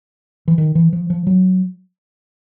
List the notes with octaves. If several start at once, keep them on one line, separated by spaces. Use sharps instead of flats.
E3
D#3
E3
F3
F3
F#3